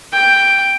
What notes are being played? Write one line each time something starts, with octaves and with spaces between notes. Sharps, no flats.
G5